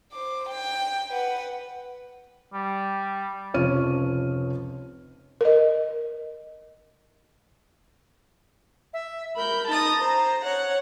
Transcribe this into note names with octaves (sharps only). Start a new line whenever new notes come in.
C5 D6
G5
B4 F#5
G3
F1 C#2 F3 C#5 F6 D#7
A#4 D#5
E5
A#4 B5 G6
D#4 A5 A#5 D#6
C5 A#5
C#5 F#5